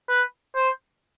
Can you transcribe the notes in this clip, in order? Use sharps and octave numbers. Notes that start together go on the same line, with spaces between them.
B4
C5